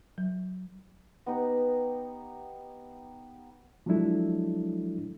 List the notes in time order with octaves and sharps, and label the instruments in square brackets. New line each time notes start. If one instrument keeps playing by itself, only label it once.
[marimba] F#3
[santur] B3 D#4 G4
[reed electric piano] F3 F#3 G#3 D4 E4 A4